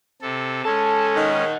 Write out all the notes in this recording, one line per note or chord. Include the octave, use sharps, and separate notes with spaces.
C3 A4
G#3 C#4 A4 A5
D#3 D#5 F#5